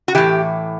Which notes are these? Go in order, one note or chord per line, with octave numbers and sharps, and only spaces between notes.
F#4
A2 E3 G4